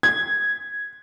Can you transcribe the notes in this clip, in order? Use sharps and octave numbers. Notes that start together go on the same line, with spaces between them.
G#6